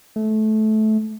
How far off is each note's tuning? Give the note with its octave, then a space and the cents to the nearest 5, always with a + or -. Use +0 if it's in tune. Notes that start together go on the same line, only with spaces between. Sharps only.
A3 -20